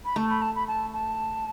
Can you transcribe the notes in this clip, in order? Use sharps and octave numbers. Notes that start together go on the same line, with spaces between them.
B5
A3 A5
B5
A5
B5
A5
A5